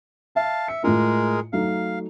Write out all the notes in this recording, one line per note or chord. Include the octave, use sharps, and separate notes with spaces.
E5 F5 A5
E5 C#7
A2 G#3 E4 F4 G#4 A#4
F#3 A3 D#4 F5